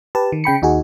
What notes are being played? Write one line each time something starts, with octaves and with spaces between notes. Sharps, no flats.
G4 B4 A5
D#3
C#3 G5 B5 C#7
D#2 D#4 F#4 G#4